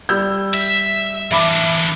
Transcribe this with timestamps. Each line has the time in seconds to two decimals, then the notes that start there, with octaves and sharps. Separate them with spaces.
0.09 G3 E6 G6
0.54 E5
1.31 E3 D4 E5 B5 D6